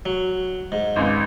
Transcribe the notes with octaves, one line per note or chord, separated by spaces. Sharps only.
F#3
G#2
G#1 C#2